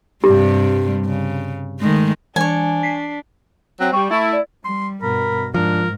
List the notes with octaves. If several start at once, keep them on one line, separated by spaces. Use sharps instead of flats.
G2 C3 G3 G4
C#3
D#3 G#3 A3
E3 D4 C#5 G#5
B6 C7
F#3 C4
G3 C#6
A3 E4
D5
G3 C6
G2 B2 A#4 B5
G#2 F3 D4 A#4